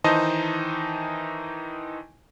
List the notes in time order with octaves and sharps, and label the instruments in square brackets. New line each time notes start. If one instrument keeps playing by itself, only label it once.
[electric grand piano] D#3 E3 D#4 C5 D#5 A5